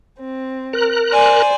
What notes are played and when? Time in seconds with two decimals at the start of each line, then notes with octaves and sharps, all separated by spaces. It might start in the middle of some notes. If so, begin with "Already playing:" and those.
0.20 C4
0.73 A#4 F#6
1.11 C5 D5 G#5